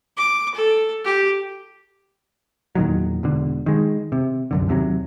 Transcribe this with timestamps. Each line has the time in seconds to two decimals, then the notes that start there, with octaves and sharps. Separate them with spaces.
0.17 D6
0.55 A4
1.05 G4
2.75 E2 A#2 D#3 F#3
3.23 E1 E2 D3
3.66 D#3 G#3
4.12 C3
4.51 C2 F#2 D3
4.68 D#2 C3 F3 F#3